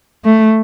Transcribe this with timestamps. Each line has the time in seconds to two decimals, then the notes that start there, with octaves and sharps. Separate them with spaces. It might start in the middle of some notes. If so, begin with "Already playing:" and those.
0.24 A3